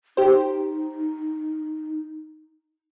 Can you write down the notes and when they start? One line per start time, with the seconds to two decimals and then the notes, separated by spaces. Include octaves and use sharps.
0.17 D#4 G4 C5